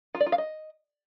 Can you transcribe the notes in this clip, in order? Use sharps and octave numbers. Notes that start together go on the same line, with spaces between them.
F4
D5
F4
F5
D#5